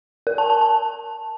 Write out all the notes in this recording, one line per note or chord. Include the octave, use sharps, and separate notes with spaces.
A#4
A5
A5
A5